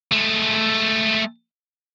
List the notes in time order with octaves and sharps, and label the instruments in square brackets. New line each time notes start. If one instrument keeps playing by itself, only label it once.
[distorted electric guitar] G#3 A3